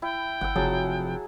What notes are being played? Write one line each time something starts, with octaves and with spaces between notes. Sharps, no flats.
E4 G5
G1 F#5 E6
F#1 C3 F3 F#3 G#4 A5